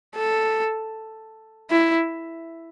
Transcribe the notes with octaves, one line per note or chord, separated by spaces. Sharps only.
A4
E4